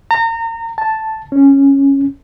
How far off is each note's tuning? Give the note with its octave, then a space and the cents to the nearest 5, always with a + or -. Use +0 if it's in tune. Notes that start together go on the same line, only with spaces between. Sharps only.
A#5 -30
A5 +0
C#4 -5